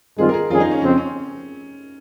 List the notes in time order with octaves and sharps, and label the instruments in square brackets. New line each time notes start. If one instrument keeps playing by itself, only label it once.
[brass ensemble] G2 D#3 G#3 C4 F4 [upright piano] G#4
[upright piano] A#4
G#4
[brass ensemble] F2 D#3 G3 C#4 G#4 [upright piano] F4
[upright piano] D#4
C#4
[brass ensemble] F2 C#3 F3 C4 [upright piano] C#4
[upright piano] C#4